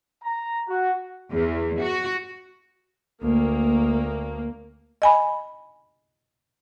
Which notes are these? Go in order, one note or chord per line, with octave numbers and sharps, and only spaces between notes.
A#5
F#4
E2
F#4
D2 A#3
D#5 G#5 B5